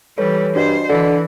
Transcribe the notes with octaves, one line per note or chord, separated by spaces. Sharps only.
E3 G3 A4 B4 C#5
G2 D4 F#4 C5 D#5
D3 E3